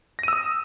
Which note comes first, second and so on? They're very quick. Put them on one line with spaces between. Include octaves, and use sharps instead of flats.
A#6 D#7 E6 D#6